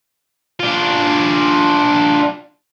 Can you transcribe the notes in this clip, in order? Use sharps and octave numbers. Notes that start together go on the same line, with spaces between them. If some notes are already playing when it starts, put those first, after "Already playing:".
D4 F4